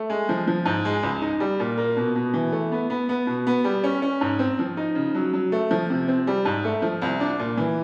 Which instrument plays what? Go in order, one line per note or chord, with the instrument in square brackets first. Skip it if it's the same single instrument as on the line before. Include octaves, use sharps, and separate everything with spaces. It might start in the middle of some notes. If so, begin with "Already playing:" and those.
Already playing: [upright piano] A3
G#3
F3
F3
G#2
G#3
C#2
D#4
G3
A#2
A#3
B2
B2
E3
A3
B3
B3
B3
B2
B3
G3
C#4
C#4
G#2
C4
F3
D#4
C#3
F#3
F#3
A3
F3
C3
C4
G3
G#2
A3
F3
C2
D4
A#2
E3